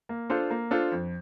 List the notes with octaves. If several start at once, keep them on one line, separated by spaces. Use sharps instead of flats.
A#3
D4 F4 A4 C5
A#3
D4 F4 A4 C5
F2